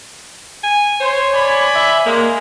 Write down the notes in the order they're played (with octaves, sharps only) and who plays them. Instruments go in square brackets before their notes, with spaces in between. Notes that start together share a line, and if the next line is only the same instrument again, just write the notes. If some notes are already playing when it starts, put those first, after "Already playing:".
[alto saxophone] G#5
[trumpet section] C5 [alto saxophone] C#5
[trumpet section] D5 G#5 B5
[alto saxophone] E5
[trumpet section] G#3 [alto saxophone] A#3